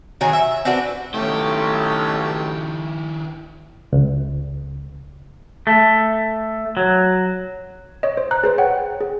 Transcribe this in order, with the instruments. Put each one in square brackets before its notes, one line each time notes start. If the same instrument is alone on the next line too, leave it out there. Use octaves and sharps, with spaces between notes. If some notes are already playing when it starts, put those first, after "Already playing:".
[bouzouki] D#3 F#3 G#4
E5
C4 D4 F#4 B4
[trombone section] B1 [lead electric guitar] D#3 E4 [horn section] A3 C#4 [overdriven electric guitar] G4
[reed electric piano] C#2
[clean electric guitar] A3
F#3
[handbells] C#5 D#5
C5
A#5 F#6
G#4 B4 C5
C#5 F#5 G5
G#4